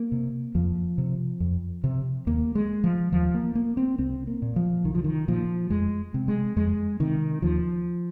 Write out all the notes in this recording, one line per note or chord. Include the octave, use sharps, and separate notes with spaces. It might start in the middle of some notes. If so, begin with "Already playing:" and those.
Already playing: A#3
C3
F2 F3
C3
F2
C3
D#2 A#3
G#3
F3
D#2 F3
A#3
A#3
C4
C2 C4
A#3
A#2
F3
C2 D#3
F3
D#3
A#2 F3
F2 G#3
C3
G#3
F2 G#3
C3 D#3
D#2 F3